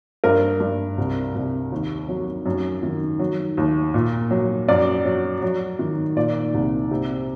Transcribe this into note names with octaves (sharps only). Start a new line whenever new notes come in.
G2 A#4
G2
C2
C2
D#2
F#3
F#2
D#3
F#3
D#2
A#2
F#3
F#2 D5
F#3
F#3
D#3
A#2 D5
C2
C3